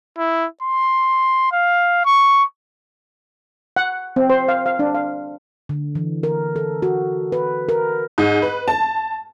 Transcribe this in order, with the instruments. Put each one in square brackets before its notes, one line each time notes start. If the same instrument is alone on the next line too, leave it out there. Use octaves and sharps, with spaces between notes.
[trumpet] E4
C6
F5
C#6
[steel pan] F#5
C4
C5
F5
F5
D4
F5
[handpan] D3
E3
A#4
A4
F#4
B4
A#4
[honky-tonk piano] G#2
B4
A5